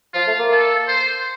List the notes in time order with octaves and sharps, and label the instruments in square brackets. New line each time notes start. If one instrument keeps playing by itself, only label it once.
[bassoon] F3 [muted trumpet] F4
[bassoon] A3
A#3
[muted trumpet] A4
C5